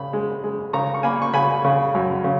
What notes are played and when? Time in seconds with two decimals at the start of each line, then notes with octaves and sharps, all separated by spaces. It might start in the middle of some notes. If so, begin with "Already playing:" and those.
Already playing: C#3 B5
0.13 G#3
0.44 G#3
0.73 C#3 A#5 C#6
0.94 C#6
1.03 A#3 G#5 B5
1.22 C#6
1.34 C#3 G#5 B5
1.65 C#3
1.95 F#2
2.24 C#3